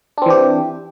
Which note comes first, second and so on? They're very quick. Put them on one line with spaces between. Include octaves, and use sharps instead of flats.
D4 C4 E3 G4